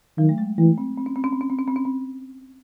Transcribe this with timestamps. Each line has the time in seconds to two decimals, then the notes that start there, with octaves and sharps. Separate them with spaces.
0.18 D#3 F#3
0.29 A3
0.38 G#3
0.58 E3 A3
0.78 C4
0.98 C4
1.06 C#4
1.16 C4
1.24 C#4
1.32 C4
1.41 C#4
1.50 C4
1.59 C#4
1.68 C4
1.76 C#4
1.85 C4